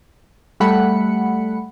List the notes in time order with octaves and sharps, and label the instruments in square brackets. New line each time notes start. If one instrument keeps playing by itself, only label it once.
[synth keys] G3 A3 F#5 B5 C#7